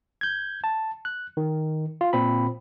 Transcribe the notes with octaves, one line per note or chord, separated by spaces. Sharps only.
G6 G#6
A5
F#6
D#3
F4
A#2 C4 B5